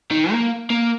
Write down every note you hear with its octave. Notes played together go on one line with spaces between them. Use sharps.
D#3
A#3
A#3